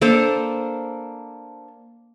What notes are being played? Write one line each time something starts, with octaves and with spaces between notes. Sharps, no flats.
A#3 D4 A4 C5